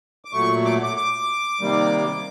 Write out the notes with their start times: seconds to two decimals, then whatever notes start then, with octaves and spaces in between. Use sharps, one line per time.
0.25 D6
0.33 A#2 F#3 A3 C#6
0.65 D6
0.83 D6
0.97 D6
1.61 C3 D#3 G3 A#3